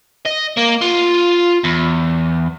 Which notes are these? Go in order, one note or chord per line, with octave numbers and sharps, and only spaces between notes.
D#5
A#3
F4
E2